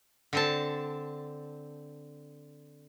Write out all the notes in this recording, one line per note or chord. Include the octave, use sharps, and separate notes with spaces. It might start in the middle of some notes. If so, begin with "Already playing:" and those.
D3 C4 A5